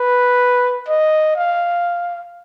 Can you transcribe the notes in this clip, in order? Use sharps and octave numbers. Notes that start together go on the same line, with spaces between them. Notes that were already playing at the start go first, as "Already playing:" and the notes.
Already playing: B4
D#5
F5